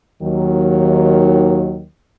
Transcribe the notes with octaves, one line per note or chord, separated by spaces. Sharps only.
D#2 D#3 F#3